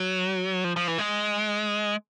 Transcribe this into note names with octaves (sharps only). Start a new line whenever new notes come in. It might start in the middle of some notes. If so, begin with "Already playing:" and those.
Already playing: F#3
F3
F3
E3
G#3